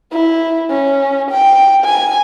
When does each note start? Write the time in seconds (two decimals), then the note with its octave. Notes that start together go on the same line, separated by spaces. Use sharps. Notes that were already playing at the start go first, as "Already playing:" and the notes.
0.12 E4
0.70 C#4
1.31 G5
1.84 G#5